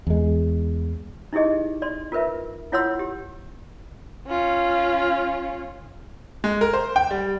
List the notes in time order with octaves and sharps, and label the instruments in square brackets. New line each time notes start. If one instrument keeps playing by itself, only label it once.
[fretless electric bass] E2 G#3
[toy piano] D#4 E4 G4 G#4 D#5
D5 C6
F4 A#4 B4 E5
E4 F4 C#5 F#5 C6 E6
G4
[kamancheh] C#4 F4
[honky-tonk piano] G#3
A#4
C5
G5
G3